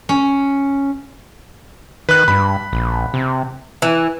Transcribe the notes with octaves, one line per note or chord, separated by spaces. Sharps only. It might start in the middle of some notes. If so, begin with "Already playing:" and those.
C#4
D#3 B4 F#6
G2 B5
A#1
C3
E3